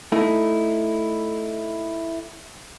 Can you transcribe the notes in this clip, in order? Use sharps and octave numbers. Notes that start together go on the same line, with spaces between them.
A3 D#4 E4